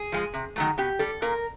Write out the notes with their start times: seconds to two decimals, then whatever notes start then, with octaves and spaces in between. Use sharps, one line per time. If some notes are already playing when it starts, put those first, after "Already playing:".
Already playing: G#4
0.12 F3 G#3
0.34 C3
0.56 D#3 F#3 A3
0.78 B2 G4
0.99 G3 A4
1.22 A#2 A#4